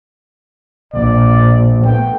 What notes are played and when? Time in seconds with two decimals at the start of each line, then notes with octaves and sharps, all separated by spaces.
0.94 A#1 D5
1.85 A3 B3 G5